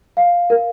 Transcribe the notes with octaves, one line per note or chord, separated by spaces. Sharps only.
F5
A#4